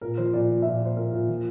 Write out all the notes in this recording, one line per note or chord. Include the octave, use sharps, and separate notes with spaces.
A#2 A#4
F3 C5
A#2 D5
F3
A#2 E5
D5
A#2 C5
A#2 A#4
A#2
F3